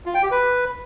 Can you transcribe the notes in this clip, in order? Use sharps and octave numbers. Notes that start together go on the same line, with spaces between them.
F4
G5
G4
B4